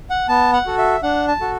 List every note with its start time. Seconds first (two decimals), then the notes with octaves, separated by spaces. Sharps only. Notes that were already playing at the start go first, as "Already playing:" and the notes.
0.10 F#5
0.28 B3 A5
0.53 F#5
0.66 F#4 A4
0.78 E5
1.03 D4 F#5
1.28 A5
1.41 F#4 A4